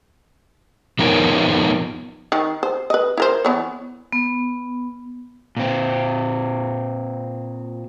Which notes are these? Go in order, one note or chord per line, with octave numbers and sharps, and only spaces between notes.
F3 B3 D#4 F4 A#4 C#5
D#3
C5
B4 D#5
E4 A#4 C5
E3 B3 C#5
B3
A#2 C4